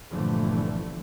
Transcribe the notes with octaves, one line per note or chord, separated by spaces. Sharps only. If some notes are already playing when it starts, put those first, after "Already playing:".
G1 A#2 D3 E3 F3 A3